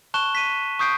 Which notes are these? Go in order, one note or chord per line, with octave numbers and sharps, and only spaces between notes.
A5 C#6 F#6 E7 G7
B6 D#7
C#6 D#6 G6 C7 D7